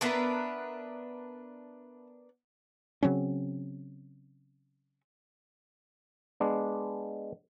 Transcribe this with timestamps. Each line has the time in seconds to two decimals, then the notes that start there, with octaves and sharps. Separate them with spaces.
0.01 B3 D4 A#4 B4 E5 A#5
3.03 C#3 F#3 C4 C#4
6.40 G#3 B3 D4